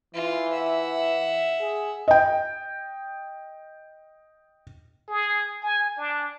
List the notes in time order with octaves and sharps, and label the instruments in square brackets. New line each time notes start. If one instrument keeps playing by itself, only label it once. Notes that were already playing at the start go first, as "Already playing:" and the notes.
[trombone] E3 [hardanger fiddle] F4
[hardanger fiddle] E5 F#5
[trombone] G#4
[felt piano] D#5 G5
[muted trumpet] G#4
G#5
D4